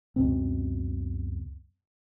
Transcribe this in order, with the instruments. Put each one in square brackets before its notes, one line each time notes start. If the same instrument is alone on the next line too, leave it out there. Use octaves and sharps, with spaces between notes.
[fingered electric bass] C#2 F#2 B2 C4